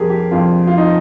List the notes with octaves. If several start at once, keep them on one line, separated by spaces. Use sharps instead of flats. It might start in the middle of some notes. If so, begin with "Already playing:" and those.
Already playing: F2 C3 G3 G4 G#4 A#4
G4
F2 C3 G3 F4
F4
D#4